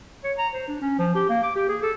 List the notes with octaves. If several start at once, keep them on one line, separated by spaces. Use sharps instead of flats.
C#5
A#5
C5
D4
C#4
F3
G4
A#3
D6
G4
G#4
A4